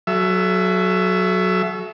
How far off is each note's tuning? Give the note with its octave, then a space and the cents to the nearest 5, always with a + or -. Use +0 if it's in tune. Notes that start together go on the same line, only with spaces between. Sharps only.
F#3 +0 A4 -40 E5 +20